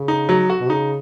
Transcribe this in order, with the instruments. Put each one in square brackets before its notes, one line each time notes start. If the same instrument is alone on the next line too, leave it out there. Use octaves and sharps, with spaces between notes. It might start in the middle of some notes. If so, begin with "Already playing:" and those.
Already playing: [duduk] C#3
[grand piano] D#4
F#3
F#4
[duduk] B2
[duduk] C#3 [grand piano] D#4